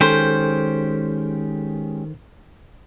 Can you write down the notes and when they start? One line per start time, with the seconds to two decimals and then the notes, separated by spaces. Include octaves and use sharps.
0.01 D#3 G#3 C#4 G4 A4 C5